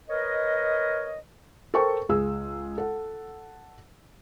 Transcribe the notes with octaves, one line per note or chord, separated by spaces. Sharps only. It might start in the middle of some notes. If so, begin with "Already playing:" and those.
A#4 B4 C#5 D#5
A4 A#4 C5 G5 C#6
C#2 G#4 E6
A4 F#5